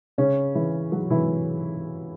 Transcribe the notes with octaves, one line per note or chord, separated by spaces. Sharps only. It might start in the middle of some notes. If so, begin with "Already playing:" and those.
C#3 C#4
E3 E4
F#3 F#4
E3 E4